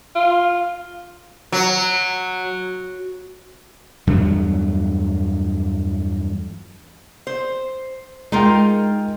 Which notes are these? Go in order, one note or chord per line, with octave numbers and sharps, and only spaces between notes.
F4
F#3
E2 G2 F#3 A3
C5
G#3 D#4 F4 A#4 G5